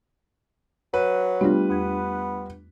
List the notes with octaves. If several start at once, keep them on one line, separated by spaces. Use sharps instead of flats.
F#3 B4
G3 A3 B3 D4 F4
E2 B3 G#6